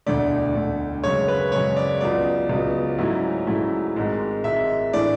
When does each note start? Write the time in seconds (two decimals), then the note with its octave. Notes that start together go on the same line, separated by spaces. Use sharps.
0.06 E1 D2 D3 A3 D5
0.55 E1 D2 D3 A3
1.04 F#2 C#3 G#3 C#5
1.28 B4
1.52 F#2 C#3 G#3 C#5
1.77 D5
2.01 C#2 C#3 F#3 B3 D5
2.49 C#2 C#3 F#3 B3
2.98 G#2 F#3 A3 C#4 E4
3.47 G#2 F#3 A3 C#4 E4
3.96 G#1 G#2 G#3
4.44 G#1 G#2 G#3 E5
4.93 A2 E3 A3 D4 D5